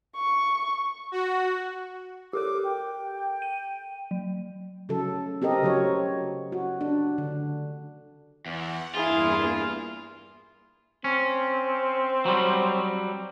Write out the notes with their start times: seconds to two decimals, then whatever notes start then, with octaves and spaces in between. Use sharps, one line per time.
0.17 C#6
1.12 F#4
2.33 G4 A4 A#4 D6
2.64 G5
3.42 D#7
4.11 F#3
4.89 C#3 F#3 A4
5.42 C4 G4 A4 A#4 D#5
5.62 C#3 F#3 C#5
6.52 F#4
6.81 D4
7.18 D3
8.46 E2 F#5
8.95 E2 G2 A#3 E4 F4 G#4
11.04 C4 C#4
12.26 F#3 G3